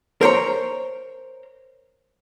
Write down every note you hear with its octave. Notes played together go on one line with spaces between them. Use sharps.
A#4 C5 C#5 A#5